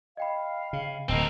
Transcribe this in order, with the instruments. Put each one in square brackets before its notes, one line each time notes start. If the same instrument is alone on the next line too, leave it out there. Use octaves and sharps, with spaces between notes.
[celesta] D#5 G5 B5 [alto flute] F5
[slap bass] C#3
[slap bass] D1 [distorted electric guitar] C4 A#4 [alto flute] D#5 [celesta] A5 E6